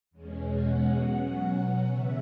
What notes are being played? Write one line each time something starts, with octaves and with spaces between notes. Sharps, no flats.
E2 B2 G#3 C#4
F#5
B2 F#3 C#4
C#3 E3 B3 E5